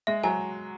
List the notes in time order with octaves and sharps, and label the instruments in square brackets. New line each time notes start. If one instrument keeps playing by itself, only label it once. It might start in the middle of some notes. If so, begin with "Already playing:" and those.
[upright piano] G#3 [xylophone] E5
[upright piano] F#3 [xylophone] G#5